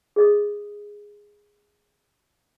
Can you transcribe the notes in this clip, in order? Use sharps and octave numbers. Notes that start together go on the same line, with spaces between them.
G#4 D#5 D#6